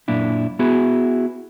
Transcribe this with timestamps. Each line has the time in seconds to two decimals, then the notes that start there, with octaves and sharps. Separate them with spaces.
0.08 F#2 A#2 D4 E4
0.59 B3 E4 F#4 G#4